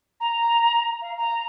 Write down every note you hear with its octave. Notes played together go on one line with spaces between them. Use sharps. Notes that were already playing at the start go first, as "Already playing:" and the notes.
A#5
F5
A#5